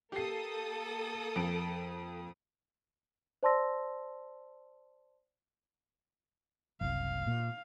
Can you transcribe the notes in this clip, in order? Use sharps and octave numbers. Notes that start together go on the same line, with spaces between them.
A#3 G4 A4 D#6 C7
F2 D7
C5 D5 A5 C6 E6 A#6
F#1 C2 F5
A#2